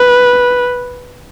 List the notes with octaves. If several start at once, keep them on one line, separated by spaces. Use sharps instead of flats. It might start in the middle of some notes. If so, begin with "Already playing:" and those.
Already playing: B4